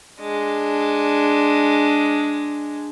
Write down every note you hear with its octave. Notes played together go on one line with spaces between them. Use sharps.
G#3 D4